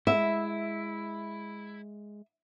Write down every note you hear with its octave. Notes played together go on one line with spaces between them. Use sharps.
G#3 E4 E5